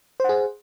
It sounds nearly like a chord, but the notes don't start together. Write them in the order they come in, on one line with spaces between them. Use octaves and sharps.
C5 F#5 G#4